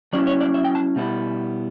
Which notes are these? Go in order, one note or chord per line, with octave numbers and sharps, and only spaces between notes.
F#3 C#4 E4 D5
C#5
D5
E5
G5
A5
B2 G3 B3 E4